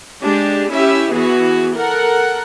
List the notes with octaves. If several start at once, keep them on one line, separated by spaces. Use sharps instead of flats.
G#3 D4 G4
C#4 E4 G4 E5
E3 B3 F#4 G#4
A4 A#4 F#5